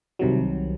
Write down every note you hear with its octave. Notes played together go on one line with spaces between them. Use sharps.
C2 C3 D#3 F#3